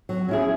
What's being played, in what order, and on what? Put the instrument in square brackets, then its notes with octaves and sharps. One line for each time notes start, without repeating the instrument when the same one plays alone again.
[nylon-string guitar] F#3
C#4 E4 G#4